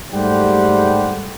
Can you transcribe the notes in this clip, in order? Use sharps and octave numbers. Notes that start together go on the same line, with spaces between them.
G#2 G3 A3 G4 C5 F#5